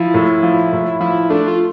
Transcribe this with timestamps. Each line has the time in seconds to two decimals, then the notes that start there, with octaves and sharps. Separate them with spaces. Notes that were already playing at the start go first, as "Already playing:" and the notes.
Already playing: F3 E4
0.14 A2
0.43 F3
0.73 A2
1.00 F3 E4
1.30 A3 D4
1.48 F4